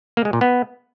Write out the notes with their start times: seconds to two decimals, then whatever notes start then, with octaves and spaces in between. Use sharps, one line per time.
0.17 A#3
0.25 G#3
0.33 A#2
0.41 B3